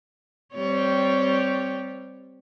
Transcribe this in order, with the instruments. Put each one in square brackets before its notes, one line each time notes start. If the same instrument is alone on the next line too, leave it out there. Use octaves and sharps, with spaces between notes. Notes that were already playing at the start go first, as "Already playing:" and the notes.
[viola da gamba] G3 C4 C#5